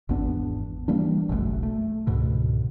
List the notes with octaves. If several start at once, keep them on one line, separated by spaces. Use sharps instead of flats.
G#1 E2 B3 D4
E3 G3 A#3 D4
F#1 B1 F#2 A3
A3
C#2 G#2 B2 D3